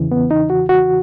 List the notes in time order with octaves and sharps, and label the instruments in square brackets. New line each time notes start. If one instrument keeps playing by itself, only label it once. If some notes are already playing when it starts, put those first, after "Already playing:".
Already playing: [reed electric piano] E2 C#3 E3
B3
D#4
F#4
F#4